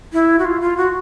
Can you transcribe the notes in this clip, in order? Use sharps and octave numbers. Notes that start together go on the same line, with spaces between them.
E4
F#4
F4
F4
F#4